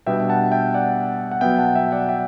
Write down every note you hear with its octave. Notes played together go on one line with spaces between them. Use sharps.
B2 G3 B3 D4 E5 G5
F#5 A5
E5 G5
D5 F#5
F#5
B2 F#3 B3 E5 G5
F#5 A5
E5 G5
D5 F#5
E5 G5